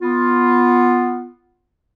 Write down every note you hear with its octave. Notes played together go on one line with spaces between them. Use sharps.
B3 F4